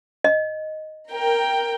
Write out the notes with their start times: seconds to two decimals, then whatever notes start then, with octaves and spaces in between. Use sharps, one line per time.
0.24 D#5
1.10 A#4 G5